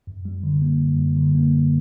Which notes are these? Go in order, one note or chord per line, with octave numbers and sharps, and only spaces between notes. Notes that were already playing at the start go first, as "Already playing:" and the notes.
F#2
G3
D3
A#3
F#2
G3
D3
A#3
F#2